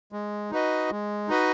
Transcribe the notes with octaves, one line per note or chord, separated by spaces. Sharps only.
G#3
D#4 F#4 B4 D#5
G#3
D#4 F#4 B4 D#5